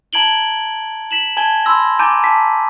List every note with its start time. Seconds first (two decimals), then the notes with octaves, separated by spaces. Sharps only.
0.13 A5 A#5 G#6 D7 F#7 G7
1.11 B6 E7 F#7
1.37 G#5 A5 G#6 G7
1.65 B5 C6 E6 A#6
1.99 G#5 A#5 D6 G6 A6 D#7
2.23 A5 B6